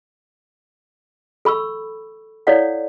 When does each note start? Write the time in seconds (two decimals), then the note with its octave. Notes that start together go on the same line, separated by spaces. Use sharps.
1.45 A4 B5 C#6 E6
2.47 E4 A4 C#5 D5 F5 F#5